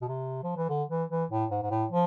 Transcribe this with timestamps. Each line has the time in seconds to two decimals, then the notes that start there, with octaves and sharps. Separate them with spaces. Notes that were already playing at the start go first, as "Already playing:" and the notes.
0.01 B2
0.08 C3
0.43 F3
0.57 E3
0.69 D3
0.90 E3
1.10 E3
1.31 A2
1.51 G#2
1.63 G#2
1.71 A2
1.91 F3